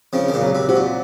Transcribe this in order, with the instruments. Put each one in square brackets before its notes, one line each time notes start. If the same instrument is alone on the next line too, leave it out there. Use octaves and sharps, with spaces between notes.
[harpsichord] C#3 F3 [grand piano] C4
[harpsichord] D#3
A#2 C#3
[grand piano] F#3
[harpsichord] C3
[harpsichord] C3 [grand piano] F#4
[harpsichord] A#2